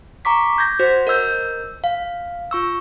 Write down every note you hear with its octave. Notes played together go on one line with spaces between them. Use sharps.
A#5 C#6 D6 B6
G6 G#6 A#6
F#4 C5
A#4 D#5 E6 G6
F5
F4 C#6 E6